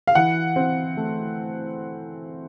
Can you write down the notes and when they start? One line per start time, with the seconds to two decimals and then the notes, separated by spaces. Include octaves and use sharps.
0.07 F5
0.15 E3 F#5
0.56 C4
0.97 A3